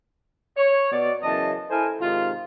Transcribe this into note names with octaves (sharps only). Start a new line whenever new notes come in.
C#5
B2 D5
F#2 C#3 E3 D#5 A5
E4 A4 A#4 C5 G#5
G#2 C3 D#3 F4